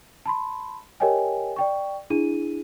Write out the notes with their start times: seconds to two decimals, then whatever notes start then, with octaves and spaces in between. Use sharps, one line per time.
0.26 A5 B5 C6
1.00 G4 A#4 C#5 D#5 G5 G#5
1.56 D5 G5 C#6
2.10 D4 E4 G#4 D#7